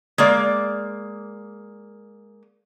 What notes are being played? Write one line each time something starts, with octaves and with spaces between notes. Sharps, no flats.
G#3 A#3 D5